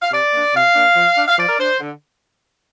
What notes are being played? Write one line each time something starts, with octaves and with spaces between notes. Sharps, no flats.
F5
C3 D5
A#3 D4
C3 F5
A#3 D4
F3
D4
F5
F3 D5
A#4
D4 C5
D3